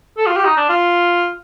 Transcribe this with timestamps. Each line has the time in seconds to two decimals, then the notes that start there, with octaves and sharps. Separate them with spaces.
0.17 A4
0.26 F4
0.36 G4
0.45 D#4
0.57 D4
0.69 F4